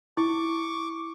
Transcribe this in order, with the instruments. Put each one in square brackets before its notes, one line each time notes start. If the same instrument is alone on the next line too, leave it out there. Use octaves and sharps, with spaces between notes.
[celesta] E4 [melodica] C#6 D6